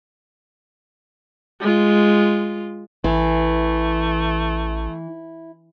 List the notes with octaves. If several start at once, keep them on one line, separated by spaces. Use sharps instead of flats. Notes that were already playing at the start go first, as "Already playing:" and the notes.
G#3 F4
A1 E3 A3 E4